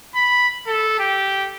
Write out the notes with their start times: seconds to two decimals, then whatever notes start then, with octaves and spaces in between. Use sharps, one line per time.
0.15 B5
0.67 A4
0.99 G4